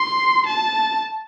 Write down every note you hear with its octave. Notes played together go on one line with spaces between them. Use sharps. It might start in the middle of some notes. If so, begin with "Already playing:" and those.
Already playing: C6
A5